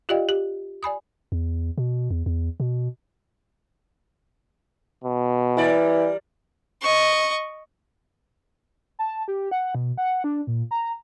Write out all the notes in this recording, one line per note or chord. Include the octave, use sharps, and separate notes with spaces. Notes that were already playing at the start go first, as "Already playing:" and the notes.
F4 G4 D5 D#5 F5 G5
G4
D5 G#5 B5 D#6
E2
B2
E2
E2
B2
B2
E3 G3 A#4 D5
D#5 C#6
A5
G4
F#5
B2
F#5
D4
A#2
A#5